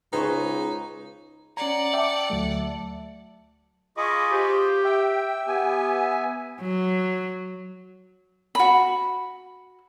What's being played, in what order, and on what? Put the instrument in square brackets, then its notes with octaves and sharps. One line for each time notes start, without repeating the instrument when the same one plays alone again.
[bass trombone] C#2 [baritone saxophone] D#4 [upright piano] G#4 C5 C#6 [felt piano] B4
[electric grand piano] C#4 A#5 [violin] D5 F#5
[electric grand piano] E5 A5 [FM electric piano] G5 D6
[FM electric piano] D2 F#3 A3
[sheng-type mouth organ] F4 G#4 D#5 [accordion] B5 C#6 D6
[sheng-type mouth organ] F4 C5 [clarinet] G4
[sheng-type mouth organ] E5 [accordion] G5
[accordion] B3 G#5 [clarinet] G4
[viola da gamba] F#3
[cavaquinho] F#4 B5